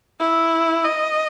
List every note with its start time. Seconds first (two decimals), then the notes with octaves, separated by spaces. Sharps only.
0.20 E4
0.85 D#5